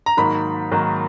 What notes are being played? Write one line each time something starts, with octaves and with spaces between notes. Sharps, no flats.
A#5
G#2 D#3 F#3 A#3 B5
G#2 D#3 F#3 A#3